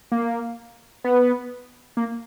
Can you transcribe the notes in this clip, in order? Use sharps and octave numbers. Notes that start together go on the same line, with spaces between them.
A#3
B3
A#3